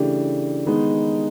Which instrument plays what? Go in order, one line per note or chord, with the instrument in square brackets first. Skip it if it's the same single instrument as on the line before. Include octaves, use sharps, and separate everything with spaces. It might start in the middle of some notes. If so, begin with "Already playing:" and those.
Already playing: [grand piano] C#3 E3 A3 D4 G4
D#3 G#3 B3 D#4